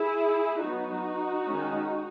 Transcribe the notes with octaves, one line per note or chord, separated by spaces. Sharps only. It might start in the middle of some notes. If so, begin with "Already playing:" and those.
Already playing: E4 G#4
F#3 B3 D#4 F#4
D#3 G#3 C#4